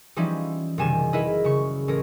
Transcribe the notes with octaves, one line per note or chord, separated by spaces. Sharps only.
E3 F3 G3 C#4 D#4 E4
F#1 C3 D#3 G3 G#5 E7
D#4 E4 G#4 A#4 B4 D#5
C#3 C#6
A1 C#4 A#4